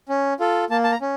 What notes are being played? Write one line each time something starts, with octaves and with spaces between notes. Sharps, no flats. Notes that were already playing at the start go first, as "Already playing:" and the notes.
C#4
F4 A4
A#3 A5
A5
A#5
C#4